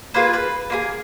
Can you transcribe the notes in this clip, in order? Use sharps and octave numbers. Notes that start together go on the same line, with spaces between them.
A#3 F4 G#4 B4
B4
A#3 F4 G#4